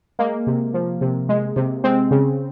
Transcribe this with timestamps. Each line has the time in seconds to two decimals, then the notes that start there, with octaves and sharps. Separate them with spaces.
0.19 G#3 A#3
0.47 C3
0.74 F3
1.01 C3
1.29 G#3
1.56 C3
1.84 G#3 C4
2.11 C#3